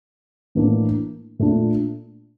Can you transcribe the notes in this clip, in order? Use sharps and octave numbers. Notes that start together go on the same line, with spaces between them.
A2 E3 A#3 D4
A#2 A3 D4